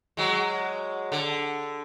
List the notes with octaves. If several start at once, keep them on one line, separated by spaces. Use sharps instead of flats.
F#3 G#3
D3